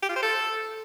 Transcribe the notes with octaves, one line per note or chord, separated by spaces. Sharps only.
G4
F4
C5
A4